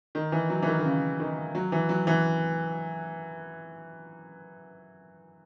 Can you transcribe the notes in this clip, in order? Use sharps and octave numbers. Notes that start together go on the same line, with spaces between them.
D#3
E3
F#3
E3
D#3
D#3
C#3
D#3
F#3
E3
F#3
E3